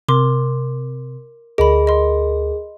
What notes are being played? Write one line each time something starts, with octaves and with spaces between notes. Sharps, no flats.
C3 A#4 C6 D6
D2 G#4 A#4 D#5 B5
D#5 C6